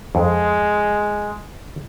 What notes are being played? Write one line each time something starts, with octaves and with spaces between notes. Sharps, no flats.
F2 G#3